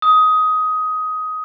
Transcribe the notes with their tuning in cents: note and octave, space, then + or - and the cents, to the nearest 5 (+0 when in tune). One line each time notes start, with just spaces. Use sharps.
D#6 +15